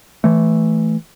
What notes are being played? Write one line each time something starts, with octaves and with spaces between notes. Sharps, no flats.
E3 A3